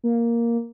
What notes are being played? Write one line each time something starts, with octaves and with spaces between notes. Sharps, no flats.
A#3